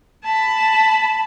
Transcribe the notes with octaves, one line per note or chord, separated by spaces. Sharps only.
A5 B5